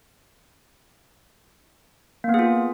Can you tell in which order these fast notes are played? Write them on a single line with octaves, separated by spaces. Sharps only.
A#3 B3 G#4 F4